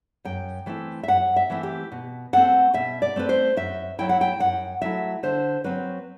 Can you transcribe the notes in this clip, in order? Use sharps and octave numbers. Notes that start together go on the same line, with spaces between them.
F#2 G5
E3 A3 C4 E4
E5
F#2 F#5
E5
E3 A3 C4 E4
G4
B2
A3 C4 F#5
B2 E5
D5
A3 C4 B4
C5
F#2 E5
F#3 A3 E4 G5
F#5
G5
F#2 F#5
F#3 A3 E4 E5
D3 C5
F#3 C4 B4